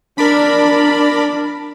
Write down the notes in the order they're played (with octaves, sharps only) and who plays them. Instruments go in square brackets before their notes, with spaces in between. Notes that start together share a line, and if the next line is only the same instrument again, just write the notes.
[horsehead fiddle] D4 [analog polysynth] A#4 D5 B5